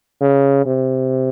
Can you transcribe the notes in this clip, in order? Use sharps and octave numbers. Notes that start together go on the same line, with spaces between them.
C#3
C3